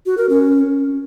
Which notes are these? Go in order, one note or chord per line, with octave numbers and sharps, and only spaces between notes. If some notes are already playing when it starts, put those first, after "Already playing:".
F#4
A#4
C#4